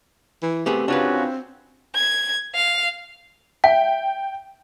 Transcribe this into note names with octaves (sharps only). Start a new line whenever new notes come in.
E3
A3 B3 C4 G4 G#4
C#3 C#4 D4 F4 F#4 B4
G#6
F5
E5 G5